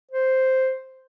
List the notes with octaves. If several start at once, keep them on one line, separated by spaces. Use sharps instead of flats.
C5